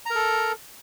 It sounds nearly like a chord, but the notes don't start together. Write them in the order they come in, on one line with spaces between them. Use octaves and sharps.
A#5 A#4 A4